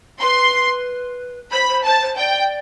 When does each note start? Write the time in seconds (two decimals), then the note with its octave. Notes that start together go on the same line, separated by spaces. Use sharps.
0.21 B4 C6
1.52 C5 B5
1.69 C5
1.85 C5 A5
2.02 C5
2.18 D5 G5